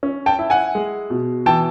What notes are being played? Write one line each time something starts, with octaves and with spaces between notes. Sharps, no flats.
C#4
G5 A5
E4
F#5 G#5
G#3
B2
E3 G5 A5